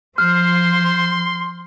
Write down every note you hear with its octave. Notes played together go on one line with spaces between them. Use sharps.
F3 C5 C6 F6